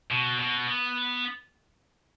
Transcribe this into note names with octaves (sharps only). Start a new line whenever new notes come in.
B2
B2
B3